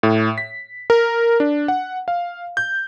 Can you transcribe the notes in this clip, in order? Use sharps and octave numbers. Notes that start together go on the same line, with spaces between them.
A2
B6
A#4
D4
F#5
F5
G6